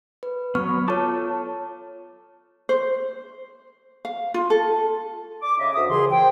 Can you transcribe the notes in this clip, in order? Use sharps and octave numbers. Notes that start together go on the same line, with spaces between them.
B4
F#3 B3 C#6 F6
F4 A4 C#5 A5 D6
C5
F5
F4
A4
D6
C#3 D#5 E5
D2 E5 D#6
C2 A#2 C#3 E3 G#4 C6
C5 G5